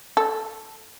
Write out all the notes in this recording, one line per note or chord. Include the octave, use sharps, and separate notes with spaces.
A4